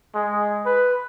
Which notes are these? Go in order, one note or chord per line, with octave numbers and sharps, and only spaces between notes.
G#3
B4